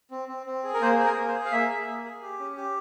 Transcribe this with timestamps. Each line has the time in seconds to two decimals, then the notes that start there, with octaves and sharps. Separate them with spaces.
0.11 C4
0.28 C4
0.46 C4
0.64 G#4
0.73 A#4
0.81 A#3 C5
0.99 G#4
1.05 A#4
1.17 A#3
1.28 C5
1.35 G#4
1.45 F5
1.52 A#3 E5
1.69 G#4
1.87 A#3
2.05 G#4
2.22 G4
2.39 C#4
2.57 G4